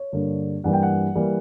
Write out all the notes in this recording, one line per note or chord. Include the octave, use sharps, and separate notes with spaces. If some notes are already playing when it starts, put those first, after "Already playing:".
Already playing: C#5
G2 D3 A#3
G2 E3 G3 A#3 F#5
G5
F#5
E3 G3 A#3